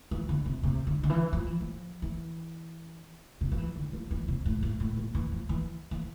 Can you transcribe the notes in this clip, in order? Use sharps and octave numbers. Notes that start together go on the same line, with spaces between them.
E3
D3
C3
C3
D3
D3
E3
F3
E3
F3
E3
C3
F3
E3
D3
F3
E3
C3
A2
A2
A2
A#2
E3
F3
E3
E3